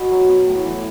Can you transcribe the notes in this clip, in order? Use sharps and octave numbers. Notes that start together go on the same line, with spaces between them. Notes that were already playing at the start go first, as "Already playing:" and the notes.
Already playing: B2 B3 C#5
F#3
B3
A2
E3